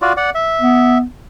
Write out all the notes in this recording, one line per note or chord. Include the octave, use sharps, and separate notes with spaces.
F4 F#4 D5
D5 F#5
E5
B3